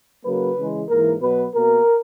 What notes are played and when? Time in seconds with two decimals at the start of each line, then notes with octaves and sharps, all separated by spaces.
0.25 C#3 F#3 A#3 B4
0.57 C#3 E3 G#3
0.89 G#2 E3 A#3 A#4
1.21 B2 F#3 B3 B4
1.54 B2 A#3 A#4